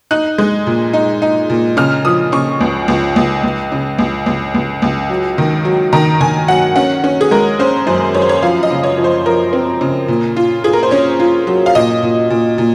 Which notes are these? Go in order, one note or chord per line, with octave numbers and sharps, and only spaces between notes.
D#4 F#6
G#3
A#2
D#4
D#4
A#2
C#3 F6
F3 D#6
C#3 C#6
C#2
C#2
C#2
C#2
C#3
C#2
C#2
C#2
C#2
F#3
D#3
F#3
D#3 A#5
D#3 G#5
F#3 F#5
C#4 F#5
C#4
G#4
G#3 A#4
C#4 C5
F#2 C5
F#2 C#5
C5
C#5
F3 F5
D#5
C#3
C#5
F3
C5
F3 A#4
C4
C#3
A#2
F4
F4 G#4
A#4
C5
C#4 C#5
F4
F#3
F5
A#2 D#5
A#2
A#2
A#2